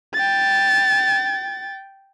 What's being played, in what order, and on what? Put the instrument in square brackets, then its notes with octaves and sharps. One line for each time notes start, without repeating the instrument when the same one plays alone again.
[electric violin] G5 A6